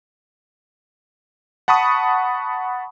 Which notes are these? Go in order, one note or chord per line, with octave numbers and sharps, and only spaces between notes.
F#5 A5 B5 C#6 D#6